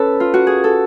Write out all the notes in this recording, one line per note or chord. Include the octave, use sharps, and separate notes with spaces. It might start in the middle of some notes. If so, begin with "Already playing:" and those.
Already playing: C#4 A4 B4
F4
F#4
G#4
A4